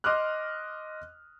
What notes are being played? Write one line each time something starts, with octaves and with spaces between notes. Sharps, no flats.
D#5 C6 D6 D#6 F6 F#6